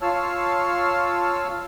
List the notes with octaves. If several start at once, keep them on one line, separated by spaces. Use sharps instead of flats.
F4 C#5 F5 A5 E6 F6